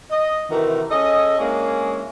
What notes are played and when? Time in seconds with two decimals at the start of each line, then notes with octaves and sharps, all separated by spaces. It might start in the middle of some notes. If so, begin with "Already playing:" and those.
0.11 D#5
0.51 C3 D#3 E3 A3 F#4 A#4
0.90 C#4 G#4 A4 D#5
1.39 G#3 A#3 C#4 D4 E4 G#4